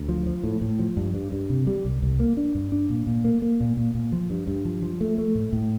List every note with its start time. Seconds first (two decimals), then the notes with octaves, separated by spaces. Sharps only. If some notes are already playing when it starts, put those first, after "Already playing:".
Already playing: D2
0.09 F3
0.26 F3
0.43 A2
0.61 A2
0.79 F3
0.97 G2
1.14 G2
1.32 G2
1.50 C3
1.67 G3
1.85 C2
2.02 C2
2.20 A#3
2.37 D4
2.55 G2
2.72 D4
2.90 A#2
3.07 A#2
3.25 A#3
3.42 A#3
3.60 A#2
3.77 A#2
3.95 A#2
4.12 F3
4.30 G2
4.47 G2
4.65 F3
4.82 F3
5.01 A3
5.18 A3
5.35 A2
5.53 A2